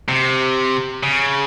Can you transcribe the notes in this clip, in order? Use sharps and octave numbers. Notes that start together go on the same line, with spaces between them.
C3
C#3